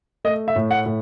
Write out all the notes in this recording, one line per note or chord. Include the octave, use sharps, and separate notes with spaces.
A3 D#5
E5
A2
F#5
A2